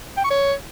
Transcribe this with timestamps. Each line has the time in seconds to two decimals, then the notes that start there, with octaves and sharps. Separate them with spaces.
0.17 G5
0.24 C#6
0.31 C#5